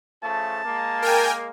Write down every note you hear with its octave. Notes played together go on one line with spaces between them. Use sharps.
C#3 F3 A3 A5
G#3 A#3
A#4 G5 G#5